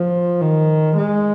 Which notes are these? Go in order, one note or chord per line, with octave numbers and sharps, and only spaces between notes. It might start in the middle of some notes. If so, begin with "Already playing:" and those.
Already playing: F3
D#3
G#3